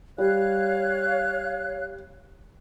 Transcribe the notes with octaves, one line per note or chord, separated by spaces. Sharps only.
G3 C#5 F5 F#6